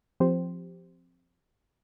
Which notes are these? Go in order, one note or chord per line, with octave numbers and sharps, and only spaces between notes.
F3 C4 G4 C5